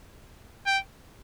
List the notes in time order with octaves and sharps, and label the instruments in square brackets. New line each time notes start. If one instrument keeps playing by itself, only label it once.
[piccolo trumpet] G5